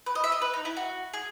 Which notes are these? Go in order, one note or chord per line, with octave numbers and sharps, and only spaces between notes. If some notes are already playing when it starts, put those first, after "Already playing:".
B4
D#5
E5
D#5
B4
D#4
E4
F#4
G#4